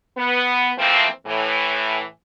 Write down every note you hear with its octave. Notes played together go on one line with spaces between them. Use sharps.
B3
E3 F3 A3 A#3 C4
A2 E3